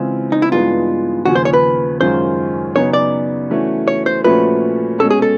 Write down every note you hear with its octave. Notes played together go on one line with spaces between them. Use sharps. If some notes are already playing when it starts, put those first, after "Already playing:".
Already playing: C#3 E3 G#3 C4 E4 F4
D#4
E4
G2 E3 G#3 B3 D#4 F4
D#2 C#3 F3 F#4
C5
C#5
B4
F#2 D#3 G#3 C#4 F4 C5
C#3 F#3 B3 D#4 C#5
D5
E3 A3 C#4 F#4
C#5
C5
A#2 F3 A3 C#4 F#4 B4
B2 G#3 C#4 A4
G#4
A4